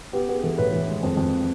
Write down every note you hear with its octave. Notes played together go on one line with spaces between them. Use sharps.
B3 G4
B3 G#4
E3 A4
A2 B4
E3
G#3
F2
F2